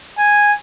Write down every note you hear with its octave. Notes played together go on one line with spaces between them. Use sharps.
G#5